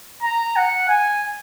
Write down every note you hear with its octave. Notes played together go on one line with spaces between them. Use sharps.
A#5
F#5
G#5